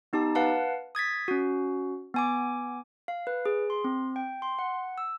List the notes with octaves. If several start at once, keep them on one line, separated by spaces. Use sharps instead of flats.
B3 D#4 G4 A5
B4 F5 F#5 A5
D#6 G#6 A6 B6
C#4 F#4
B3 G#5 D6
F5
B4
G#4
C6
C4
G5
C6
F#5
E6